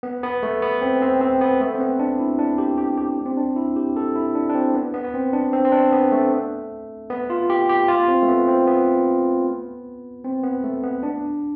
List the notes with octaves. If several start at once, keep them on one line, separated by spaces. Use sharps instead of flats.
B3
B3
A3
B3
C4
C4
C4
B3
A3
C4
B3
D4
E4
D4
G4
G4
G4
C4
D4
E4
G4
A4
E4
D4
D4
C4
B3
B3
B3
C4
D4
C4
C4
D4
B3
A3
B3
F4
G4
G4
F4
C4
A3
B3
C4
B3
C4
B3
A3
B3
D4